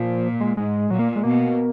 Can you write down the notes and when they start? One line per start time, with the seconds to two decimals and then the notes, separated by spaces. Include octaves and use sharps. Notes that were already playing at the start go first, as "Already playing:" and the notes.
Already playing: A#2 F3
0.40 G#3
0.57 G#2 G#3
0.91 A#2 F#3
0.99 A#3
1.16 G#3
1.24 B2 A#3